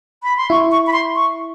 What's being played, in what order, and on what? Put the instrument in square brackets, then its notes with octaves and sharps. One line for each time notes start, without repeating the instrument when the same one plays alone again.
[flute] B5
C6
[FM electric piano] E4 [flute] C#6
[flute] C#6
B5
C6
C#6